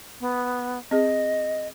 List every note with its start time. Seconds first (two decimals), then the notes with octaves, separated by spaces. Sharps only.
0.20 B3
0.91 C4 G#4 D#5